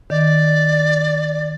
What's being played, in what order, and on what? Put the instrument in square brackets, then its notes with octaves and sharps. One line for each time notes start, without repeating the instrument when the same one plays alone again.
[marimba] D#3 [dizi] D5